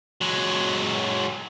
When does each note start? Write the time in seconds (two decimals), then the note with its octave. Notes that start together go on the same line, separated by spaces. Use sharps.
0.21 F#3 G#3